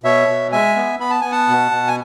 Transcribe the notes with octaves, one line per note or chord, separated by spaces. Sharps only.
B2 C#5 E5
B2
G#3 E5 G#5
B3
B3 B5
A5
B3 G#5
F#5 A5
B2
B2
G#5